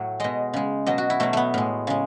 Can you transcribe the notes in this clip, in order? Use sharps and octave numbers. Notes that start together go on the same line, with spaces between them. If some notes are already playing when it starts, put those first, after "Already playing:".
Already playing: A2 F#3 C#5
B2 G#3 D#5
C#3 G#3
B2 F#3 D#5
F#4
E4
B2 F#3 A3
A3 B3
A2 G#3
C#3 G#3